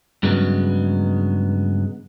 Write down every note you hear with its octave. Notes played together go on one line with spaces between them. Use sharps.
G2 C#3 F#3 G#3 B3